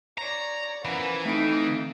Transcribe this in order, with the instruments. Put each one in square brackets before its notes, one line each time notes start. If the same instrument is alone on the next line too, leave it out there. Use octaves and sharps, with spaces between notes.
[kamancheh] C#5 D5 [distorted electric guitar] A#5
[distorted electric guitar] E3 [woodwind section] F3 C#4 A#5 [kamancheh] A#3 B3 [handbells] B5
[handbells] A3 C4 D7 [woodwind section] D#4 [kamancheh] A4 F5